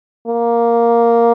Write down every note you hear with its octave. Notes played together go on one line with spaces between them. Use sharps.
A#3